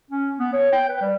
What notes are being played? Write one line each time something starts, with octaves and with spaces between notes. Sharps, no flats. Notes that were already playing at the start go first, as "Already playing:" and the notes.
C#4
B3
C#5
G5
B4
G3